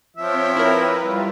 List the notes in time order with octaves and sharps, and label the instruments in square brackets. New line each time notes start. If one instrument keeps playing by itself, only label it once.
[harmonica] F3 E5 [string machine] C4 C#5 G5
[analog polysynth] E4 A#4 [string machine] B4
[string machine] G3 F4